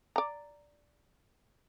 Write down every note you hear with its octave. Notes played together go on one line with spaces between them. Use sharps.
D5 A#5